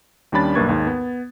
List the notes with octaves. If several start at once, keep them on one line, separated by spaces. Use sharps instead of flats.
D#2 G3 C#4 D4 B5 A6
B1 G2 A#3 B4 C#6 G#6
D#2 G#2
B3